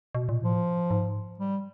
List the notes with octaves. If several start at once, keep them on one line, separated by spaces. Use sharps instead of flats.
B2
A#2
A2 F3
G#2
G3